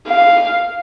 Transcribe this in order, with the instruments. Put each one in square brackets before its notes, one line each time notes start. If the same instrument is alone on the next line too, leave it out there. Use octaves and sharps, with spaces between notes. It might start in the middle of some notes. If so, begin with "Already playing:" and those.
[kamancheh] F5